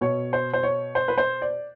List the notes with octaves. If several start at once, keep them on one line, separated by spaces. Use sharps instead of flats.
B2 C#5
C5
C5
C#5
C5
B4
C5
D5